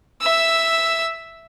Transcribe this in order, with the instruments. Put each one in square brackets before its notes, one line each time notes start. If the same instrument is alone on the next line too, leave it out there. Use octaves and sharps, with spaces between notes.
[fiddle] E5 E6